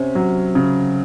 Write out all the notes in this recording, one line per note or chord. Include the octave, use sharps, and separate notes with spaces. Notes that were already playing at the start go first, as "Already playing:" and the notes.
Already playing: C3 C#4
F#3
C#3